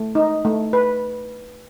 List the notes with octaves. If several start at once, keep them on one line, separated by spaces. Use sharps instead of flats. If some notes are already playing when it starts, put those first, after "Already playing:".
Already playing: A3
D#4
A3
B4